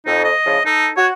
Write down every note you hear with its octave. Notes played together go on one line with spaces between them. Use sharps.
F2 D#4
D#5
C#3 E3 F3
D#4 A4
F#4 C#5